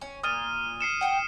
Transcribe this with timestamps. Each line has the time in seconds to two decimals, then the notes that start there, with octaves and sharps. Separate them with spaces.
0.01 C#4
0.23 A#2 D#6 F6 D#7
0.81 C7 C#7 E7
1.01 F#5 G5